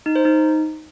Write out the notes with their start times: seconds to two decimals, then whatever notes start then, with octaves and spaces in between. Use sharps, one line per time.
0.06 D#4
0.16 C5
0.25 D#4